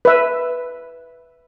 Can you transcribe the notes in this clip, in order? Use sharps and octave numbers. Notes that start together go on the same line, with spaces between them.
B4 E5